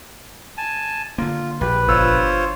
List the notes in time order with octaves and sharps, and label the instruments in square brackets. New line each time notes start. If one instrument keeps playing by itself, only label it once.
[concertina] G#5 A5
[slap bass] D3 A#3 [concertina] F4
[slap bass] A#1 [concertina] G4 [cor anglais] B4
[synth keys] G1 E6 [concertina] F4 C5 C#5